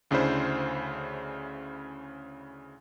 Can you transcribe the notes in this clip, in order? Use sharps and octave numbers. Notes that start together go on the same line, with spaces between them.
D2 C#3 D4 E4 C5